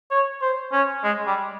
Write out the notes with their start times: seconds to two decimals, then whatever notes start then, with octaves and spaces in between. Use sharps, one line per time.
0.11 C#5
0.42 C5
0.73 C#4
1.04 G#3
1.27 G3